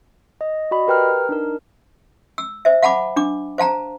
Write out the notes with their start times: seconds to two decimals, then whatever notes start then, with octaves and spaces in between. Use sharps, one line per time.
0.41 D#5
0.71 F#4 D5 D#5 B5
0.87 G4 A#4 B4 G5 A#5 F6
1.29 D4 D#4 A#4
2.38 E6
2.65 C5 E5
2.83 F5 F#5 A5 B5 D6
3.16 D4 D6
3.58 C5 F5 A5 A#5